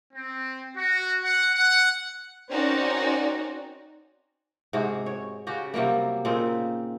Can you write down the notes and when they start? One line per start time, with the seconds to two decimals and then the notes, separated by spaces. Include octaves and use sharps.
0.14 C4
0.76 F#4
1.23 F#5
1.54 F#5
2.50 C4 C#4 D#4 F#4 A#4 D5
4.73 G#2 C3 F#4 G#4
5.06 C#5
5.47 C#3 F#4 G4
5.74 C3 F#3 G3 A#3
6.25 A#2 C#3 C4 D#4